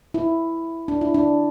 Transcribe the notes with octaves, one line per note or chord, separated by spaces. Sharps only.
E4
D4
E4
D4